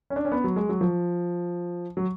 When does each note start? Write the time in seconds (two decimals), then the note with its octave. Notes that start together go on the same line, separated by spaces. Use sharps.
0.10 C#4
0.16 D4
0.25 C#4
0.32 B3
0.44 F#3
0.56 G#3
0.69 F#3
0.81 F3
1.97 F#3